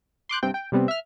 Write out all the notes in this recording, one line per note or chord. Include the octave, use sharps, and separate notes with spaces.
C6 D6 F#6 G6
G2 C3 C4 G5
G5
C3 G3 B3 C4
E5 F6